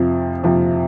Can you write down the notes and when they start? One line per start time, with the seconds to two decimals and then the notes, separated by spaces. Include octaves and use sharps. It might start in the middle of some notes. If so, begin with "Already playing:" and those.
Already playing: F2 C3 F3
0.44 F2 C3 F3